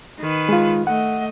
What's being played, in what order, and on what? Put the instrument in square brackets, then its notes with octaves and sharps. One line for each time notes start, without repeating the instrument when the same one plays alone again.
[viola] D#3 B4
[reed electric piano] G#3 F4
[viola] A3 D#5 [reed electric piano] F#5